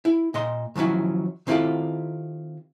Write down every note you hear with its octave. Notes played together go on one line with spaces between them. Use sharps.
E4
A#2 D#5 C6
D#3 F3 F#3 C#4 E4
D#3 C4 E4 F4 G4 A4